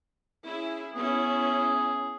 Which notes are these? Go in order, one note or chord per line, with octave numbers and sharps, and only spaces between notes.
C#4 E4 G#4
B3 C#4 E4 G#4